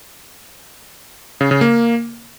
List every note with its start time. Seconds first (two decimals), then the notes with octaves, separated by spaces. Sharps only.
1.41 C#3
1.51 C#3
1.61 A#3